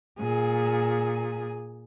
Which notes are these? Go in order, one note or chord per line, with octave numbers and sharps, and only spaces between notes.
A#2 G#4